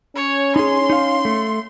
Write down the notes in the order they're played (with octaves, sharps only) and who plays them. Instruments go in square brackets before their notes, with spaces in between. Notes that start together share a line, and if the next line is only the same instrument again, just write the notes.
[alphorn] C#4 [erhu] C#5
[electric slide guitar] D#4 G#4 [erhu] C6
[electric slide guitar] D#4 F5
A3